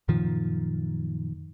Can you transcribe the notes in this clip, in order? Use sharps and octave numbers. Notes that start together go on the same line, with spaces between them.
F#2 A#2 D#3 F3